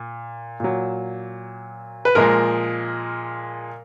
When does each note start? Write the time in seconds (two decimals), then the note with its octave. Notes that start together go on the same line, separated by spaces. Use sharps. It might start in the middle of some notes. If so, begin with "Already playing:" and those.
Already playing: A#2
0.60 A#2 F#3
2.05 B4
2.15 A#2 F3 G#3 A#4